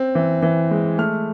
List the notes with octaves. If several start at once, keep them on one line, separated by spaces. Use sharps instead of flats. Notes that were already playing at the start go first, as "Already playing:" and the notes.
Already playing: C4
E3
E3
G#3
A3 F6